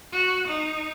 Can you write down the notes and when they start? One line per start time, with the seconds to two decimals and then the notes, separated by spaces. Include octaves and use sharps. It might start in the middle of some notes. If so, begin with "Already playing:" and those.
0.12 F#4
0.48 D#4